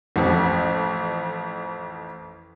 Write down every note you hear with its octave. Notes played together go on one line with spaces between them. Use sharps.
A1 F2